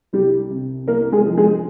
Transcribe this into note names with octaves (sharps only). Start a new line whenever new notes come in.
C2 G3 G4
C3
C2 A#3 A#4
G#3 G#4
F3
G#3 G#4